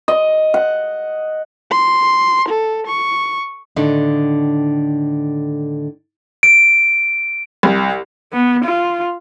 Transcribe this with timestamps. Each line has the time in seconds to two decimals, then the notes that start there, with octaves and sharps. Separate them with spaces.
0.08 D#5
0.54 F#5
1.71 C6
2.48 A4
2.87 C#6
3.76 A2 D3 D#3 D4 D#4
6.43 D7
7.63 C2
8.33 B3
8.64 F4